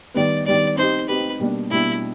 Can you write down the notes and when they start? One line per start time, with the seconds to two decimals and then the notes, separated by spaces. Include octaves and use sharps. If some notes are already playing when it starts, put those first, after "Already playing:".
0.14 D#3 G3 B3 D5
0.46 D#3 G3 B3 D5
0.77 C4 D#4 G4 C5
1.08 C4 D#4 G4 B4
1.40 B2 G3 A#3 D4
1.70 B2 G3 A#3 D4 E4